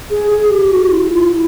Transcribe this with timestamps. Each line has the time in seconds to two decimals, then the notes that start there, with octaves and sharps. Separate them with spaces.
0.10 G#4
0.31 G#4
0.50 G4
0.71 F#4
0.90 E4
1.10 F4
1.30 E4